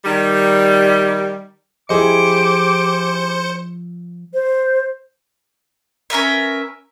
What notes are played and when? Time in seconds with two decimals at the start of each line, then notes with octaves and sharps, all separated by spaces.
0.03 D#3 G3
1.89 F3 E4 G4 G#4 C5 D#5 D6 C#7
4.34 C5
6.10 C#4 A#4 B4 E5